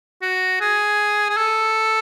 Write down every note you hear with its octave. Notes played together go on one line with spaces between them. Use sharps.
F#4
G#4
G#4
A4